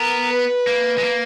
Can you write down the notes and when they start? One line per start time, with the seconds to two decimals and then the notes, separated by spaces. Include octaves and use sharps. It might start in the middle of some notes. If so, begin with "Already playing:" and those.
Already playing: B3 A#4
0.30 B4
0.67 A#3
0.98 G#3
1.04 A#3